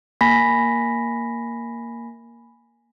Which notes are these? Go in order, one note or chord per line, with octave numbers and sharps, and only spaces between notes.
A#3 G#5 B5 A#6 B6